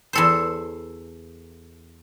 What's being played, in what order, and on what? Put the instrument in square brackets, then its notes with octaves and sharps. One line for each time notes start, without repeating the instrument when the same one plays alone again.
[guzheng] E2 A4 C5